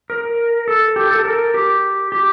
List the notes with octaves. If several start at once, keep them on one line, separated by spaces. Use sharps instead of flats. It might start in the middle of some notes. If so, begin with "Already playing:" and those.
A#4
A4
G4
A4
A#4
G4
G4